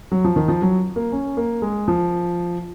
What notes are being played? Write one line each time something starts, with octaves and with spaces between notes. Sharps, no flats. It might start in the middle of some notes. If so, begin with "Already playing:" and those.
F#3
F3
D#3
F3
F#3
A#3
C#4
A#3
G#3
F3